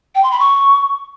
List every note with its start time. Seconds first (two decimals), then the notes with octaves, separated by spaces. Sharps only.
0.15 G5
0.23 C6
0.32 B5
0.40 C#6